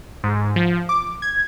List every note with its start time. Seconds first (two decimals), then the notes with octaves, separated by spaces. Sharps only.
0.24 G#2
0.56 F3
0.89 D6
1.22 G#6